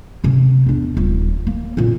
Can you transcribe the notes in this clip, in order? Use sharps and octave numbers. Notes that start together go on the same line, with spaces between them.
C3 C#4
E2 D4
D#1
A#3
F#2 A#2